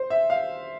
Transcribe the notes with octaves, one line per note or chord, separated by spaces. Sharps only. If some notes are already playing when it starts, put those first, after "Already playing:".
Already playing: C5
E5
F5